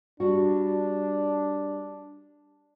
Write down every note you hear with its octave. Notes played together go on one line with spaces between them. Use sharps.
G3 D4 F#4